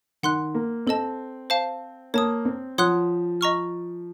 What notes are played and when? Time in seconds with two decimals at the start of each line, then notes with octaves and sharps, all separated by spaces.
0.23 D#3 F#5 C6 F#6
0.55 A#3
0.87 C4 A4 D#5 A5
1.50 C5 F5 A5
2.14 A#3 C#5 A5 D#6
2.45 C4
2.78 F3 C#5 F#5 C6 D#6 F#6
3.41 D#5 A#5 C#6 F6